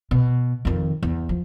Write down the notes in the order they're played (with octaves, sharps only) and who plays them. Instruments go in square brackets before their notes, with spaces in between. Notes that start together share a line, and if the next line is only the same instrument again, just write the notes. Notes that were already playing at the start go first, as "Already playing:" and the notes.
[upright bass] B2
F2 D#3
E2
F3